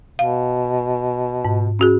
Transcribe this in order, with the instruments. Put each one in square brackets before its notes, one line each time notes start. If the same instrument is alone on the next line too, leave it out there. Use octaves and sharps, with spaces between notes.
[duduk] B2 [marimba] F5
[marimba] G#2
C#4 F#4 G#4